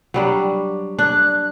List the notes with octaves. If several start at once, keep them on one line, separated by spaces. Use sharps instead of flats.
F#3 G3 D4
D4 F#6